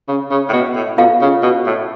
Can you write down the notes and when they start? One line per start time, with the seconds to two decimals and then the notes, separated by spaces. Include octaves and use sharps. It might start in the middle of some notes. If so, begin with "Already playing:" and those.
0.08 C#3
0.31 C#3
0.49 A2
0.53 B2
0.75 A2
0.98 B2 F4 A4 F5
1.21 C#3
1.43 B2
1.66 A2